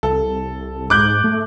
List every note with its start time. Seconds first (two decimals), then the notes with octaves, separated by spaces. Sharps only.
0.03 C2 A4
0.90 G#2 D6 F#6 G6
1.24 A3